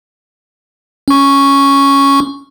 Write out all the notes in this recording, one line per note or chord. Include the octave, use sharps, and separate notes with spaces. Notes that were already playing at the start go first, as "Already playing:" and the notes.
C#4 C#6